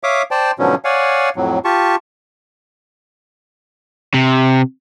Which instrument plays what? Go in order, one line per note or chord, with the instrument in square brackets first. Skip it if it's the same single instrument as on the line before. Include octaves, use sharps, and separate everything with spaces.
[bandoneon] C#5 E5 F5 D6 D#6
C5 D5 G5 A5
G#2 B2 D3 F3 F#3 C#4
C#5 D5 F5 F#5 G#5
F2 A2 F#3
F4 G4 A5 C#6
[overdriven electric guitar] C3